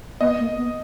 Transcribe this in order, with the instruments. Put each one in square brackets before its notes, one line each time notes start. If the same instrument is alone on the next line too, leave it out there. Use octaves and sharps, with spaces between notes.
[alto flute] B3 [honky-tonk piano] D#5
[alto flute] A#3
B3